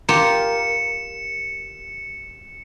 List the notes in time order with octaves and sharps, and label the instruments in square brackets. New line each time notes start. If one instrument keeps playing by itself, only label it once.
[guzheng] F4 G4 A#4 [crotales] C#7 E7